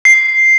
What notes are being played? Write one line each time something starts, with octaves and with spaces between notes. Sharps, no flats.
C7